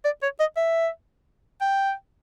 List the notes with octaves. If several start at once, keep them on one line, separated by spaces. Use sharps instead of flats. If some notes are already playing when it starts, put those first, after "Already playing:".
D5
C#5
D#5
E5
G5